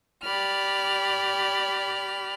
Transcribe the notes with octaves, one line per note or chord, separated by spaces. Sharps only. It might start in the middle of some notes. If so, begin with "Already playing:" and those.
G4 D5 B5 F6